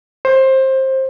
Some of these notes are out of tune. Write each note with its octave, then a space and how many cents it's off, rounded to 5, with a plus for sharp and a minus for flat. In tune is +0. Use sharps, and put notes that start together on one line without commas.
C5 +20